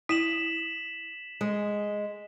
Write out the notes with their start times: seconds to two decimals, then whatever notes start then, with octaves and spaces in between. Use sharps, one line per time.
0.09 E4 B6 E7 F#7
1.41 G#3